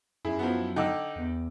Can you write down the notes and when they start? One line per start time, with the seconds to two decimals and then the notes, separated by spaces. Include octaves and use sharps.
0.25 F#2 E4 G#4
0.39 F3 F#3 B3
0.76 D3 D#4 G5 D6 E6
1.16 E2